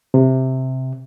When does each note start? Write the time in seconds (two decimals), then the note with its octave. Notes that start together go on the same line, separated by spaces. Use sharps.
0.14 C3